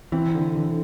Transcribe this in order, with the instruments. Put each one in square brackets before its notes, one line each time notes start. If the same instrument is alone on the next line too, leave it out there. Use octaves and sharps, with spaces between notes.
[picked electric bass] E3 [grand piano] C4
[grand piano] D3
D3